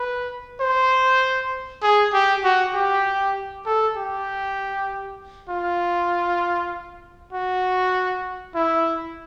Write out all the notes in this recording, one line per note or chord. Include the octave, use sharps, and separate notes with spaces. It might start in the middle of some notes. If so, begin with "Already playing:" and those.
Already playing: B4
C5
G#4
G4
F#4
G4
A4
G4
F4
F#4
E4